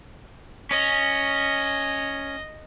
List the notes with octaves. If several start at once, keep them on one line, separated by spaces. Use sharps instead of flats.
C#4 D#5